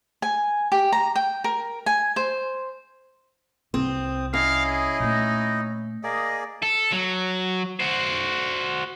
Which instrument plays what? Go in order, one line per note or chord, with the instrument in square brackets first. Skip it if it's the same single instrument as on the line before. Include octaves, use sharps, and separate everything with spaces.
[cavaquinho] G#5
G4
A#5
G5
A#4
G#5
C5
[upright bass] C2 [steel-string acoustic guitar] C4 [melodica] D#6
[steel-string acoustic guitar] C#4 [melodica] E4 D#5 [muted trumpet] F5
[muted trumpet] G#4
[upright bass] A#2 A3 [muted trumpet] D#4
[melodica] A#3 G#4 D5 [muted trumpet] D#5
[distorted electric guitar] A4
F#3
F#4 C5